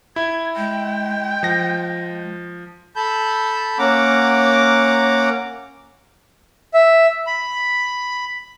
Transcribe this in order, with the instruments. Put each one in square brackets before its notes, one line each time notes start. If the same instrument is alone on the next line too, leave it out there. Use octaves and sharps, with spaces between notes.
[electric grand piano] E4 [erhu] G#6
[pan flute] G#3 [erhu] G5
[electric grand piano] F3 A#6
[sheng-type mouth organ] A4 A5 B5 G6
A#3 C#4 F#5 A#5 D6
E5
B5